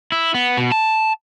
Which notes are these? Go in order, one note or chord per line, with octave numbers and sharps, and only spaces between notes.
E4
B3
B2
A5